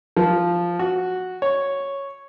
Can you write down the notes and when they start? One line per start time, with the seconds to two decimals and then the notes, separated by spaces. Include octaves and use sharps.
0.17 F3
0.79 F#4
1.42 C#5